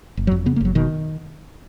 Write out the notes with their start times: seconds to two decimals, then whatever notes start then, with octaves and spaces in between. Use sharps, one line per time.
0.17 F#1
0.27 F#3
0.31 F2
0.46 C#3 B3
0.56 A#3
0.61 F#1 F#3
0.75 B2 D#3